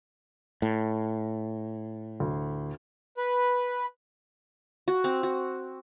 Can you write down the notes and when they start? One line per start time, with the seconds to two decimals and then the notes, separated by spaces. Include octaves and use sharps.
0.62 A2
2.20 D2
3.17 B4
4.88 F#4
5.04 C4
5.23 F#4